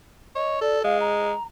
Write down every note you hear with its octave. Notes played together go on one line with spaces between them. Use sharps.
C#5 D#5
A4 D5
G#3 F5
A#5